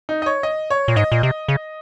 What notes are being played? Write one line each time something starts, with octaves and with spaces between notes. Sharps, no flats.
D#4
D#5
C#5
D#5
C#5
A#2
G#2 D#5
A#2
C3
C#3